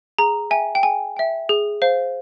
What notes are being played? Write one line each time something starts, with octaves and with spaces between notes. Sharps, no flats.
G#4 A#5
E5 G5 G#5
G5
G#4 G#5
E5 G5
G#4
C5 F5